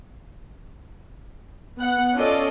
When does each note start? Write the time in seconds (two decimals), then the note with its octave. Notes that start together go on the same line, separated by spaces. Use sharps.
1.78 B3 F#5
2.15 C#4 F4 A4 D5 D#5